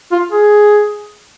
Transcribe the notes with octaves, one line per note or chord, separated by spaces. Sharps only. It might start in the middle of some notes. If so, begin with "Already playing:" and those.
F4
G#4